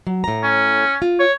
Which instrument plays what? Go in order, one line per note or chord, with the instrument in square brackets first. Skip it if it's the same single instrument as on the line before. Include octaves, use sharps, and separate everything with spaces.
[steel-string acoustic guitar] F#3
A2 A#5
[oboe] C#4
[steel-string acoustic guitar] F4
[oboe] C#5